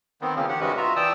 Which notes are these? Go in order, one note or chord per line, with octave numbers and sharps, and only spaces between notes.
D#3 B3 C4
C#3 F3 A#3 C4 C#4
D#3 G4 F#5
G2 C3 G#3 C#4 F#4 B4
F4 F#4 E5 A#5
E3 D5 G5 A5 D#6 E6